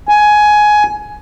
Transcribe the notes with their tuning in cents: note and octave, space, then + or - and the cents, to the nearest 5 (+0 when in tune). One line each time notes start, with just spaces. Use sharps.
G#5 +15